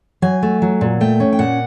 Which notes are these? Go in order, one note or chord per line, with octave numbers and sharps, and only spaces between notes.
F#3 G#5
A3
F#3
A#2
A3 G5
C#4
G5
A#2 F#5